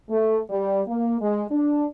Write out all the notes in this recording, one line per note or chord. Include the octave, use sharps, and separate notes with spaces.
A3
G3
A#3
G#3
D4